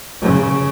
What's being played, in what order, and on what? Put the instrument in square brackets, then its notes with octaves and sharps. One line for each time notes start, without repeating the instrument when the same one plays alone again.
[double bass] C#3